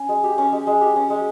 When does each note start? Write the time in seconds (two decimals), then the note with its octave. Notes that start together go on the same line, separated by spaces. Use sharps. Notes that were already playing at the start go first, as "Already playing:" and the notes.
Already playing: C#4
0.09 G#3
0.24 G4
0.38 C#4
0.52 G#3
0.67 G#3
0.81 G4
0.96 C#4
1.10 G#3